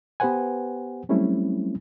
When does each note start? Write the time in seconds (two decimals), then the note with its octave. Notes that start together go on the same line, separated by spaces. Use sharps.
0.20 B3 G4 B4 C5 F#5 G#5
1.09 F#3 G3 A3 C4 C#4 E4